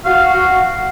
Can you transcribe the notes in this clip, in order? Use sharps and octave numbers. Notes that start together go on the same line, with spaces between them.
F#4 F5